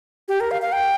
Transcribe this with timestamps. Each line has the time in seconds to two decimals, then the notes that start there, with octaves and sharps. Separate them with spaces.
0.28 G4
0.40 A#4
0.51 F5
0.62 F5
0.72 G5